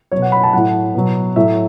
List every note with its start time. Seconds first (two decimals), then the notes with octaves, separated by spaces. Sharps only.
0.12 B2 F#3 C#5
0.22 F#5
0.32 B5
0.43 A5
0.53 A2 F#3 F#5
0.94 B2 F#3
1.36 A2 F#3 E5